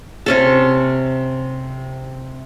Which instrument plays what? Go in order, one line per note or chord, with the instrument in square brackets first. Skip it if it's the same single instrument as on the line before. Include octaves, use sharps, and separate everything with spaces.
[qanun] C3 C#4 A4